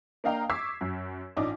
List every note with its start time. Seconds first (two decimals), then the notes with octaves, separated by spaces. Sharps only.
0.24 A#3 D4 D#5 F5 G5 A#5
0.50 C#6 D6 E6 G#6 B6 C7
0.81 F#2
1.36 A1 D4 D#4 F4 D6